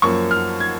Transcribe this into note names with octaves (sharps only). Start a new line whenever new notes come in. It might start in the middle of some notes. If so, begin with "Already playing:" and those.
F#2 F3 A#3 C#6
F6
G#6